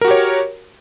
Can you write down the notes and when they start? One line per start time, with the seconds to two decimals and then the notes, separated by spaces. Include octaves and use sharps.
0.01 A#4
0.05 F#4
0.08 G4
0.11 C#5